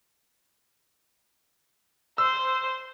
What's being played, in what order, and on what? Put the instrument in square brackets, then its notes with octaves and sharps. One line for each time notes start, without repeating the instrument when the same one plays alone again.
[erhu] C5 [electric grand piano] E6